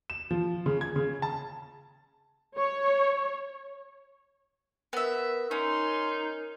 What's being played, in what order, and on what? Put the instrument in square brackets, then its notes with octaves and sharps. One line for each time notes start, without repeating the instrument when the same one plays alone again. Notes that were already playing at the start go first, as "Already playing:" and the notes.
[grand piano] E7
F3
C#3
G#6
C#3
A5
[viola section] C#5
[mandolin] B3 E5 [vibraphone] A#4
[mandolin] C#4 [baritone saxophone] D#4 [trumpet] C6